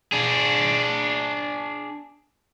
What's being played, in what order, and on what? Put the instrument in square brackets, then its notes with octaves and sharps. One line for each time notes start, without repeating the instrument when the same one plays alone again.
[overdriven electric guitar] D4 G#4